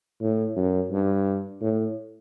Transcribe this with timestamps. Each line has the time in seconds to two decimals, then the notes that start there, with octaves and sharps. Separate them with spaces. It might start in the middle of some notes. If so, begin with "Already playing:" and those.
0.21 A2
0.56 F#2
0.91 G2
1.61 A2